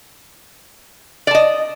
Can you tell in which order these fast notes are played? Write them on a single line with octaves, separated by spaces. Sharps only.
D5 A5 D#5